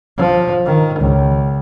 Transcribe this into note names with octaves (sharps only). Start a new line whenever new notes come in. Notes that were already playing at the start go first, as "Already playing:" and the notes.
F3
D#3
C#2